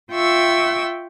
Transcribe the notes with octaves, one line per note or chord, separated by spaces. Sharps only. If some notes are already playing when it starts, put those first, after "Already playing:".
F4 E5 G5 C#6 E6